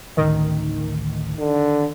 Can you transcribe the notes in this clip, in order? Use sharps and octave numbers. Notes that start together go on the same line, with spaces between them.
A1 D2 D#3
D3